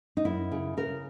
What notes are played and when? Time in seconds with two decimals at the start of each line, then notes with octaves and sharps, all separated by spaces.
0.17 D#4
0.25 F#2 E4
0.52 C#3
0.77 C#3 A#4